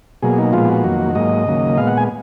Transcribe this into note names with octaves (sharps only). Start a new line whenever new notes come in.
B2 F#3 A#3 G#4
D#4
A#2 F3 G#3 B3 F4
F#4
F2 D#3 F#3 A#3
G#2 F#3 A#3 D#5
D#2 C#3 F#3 A#3
A#2 G#3 B3 F5
F#5
G#5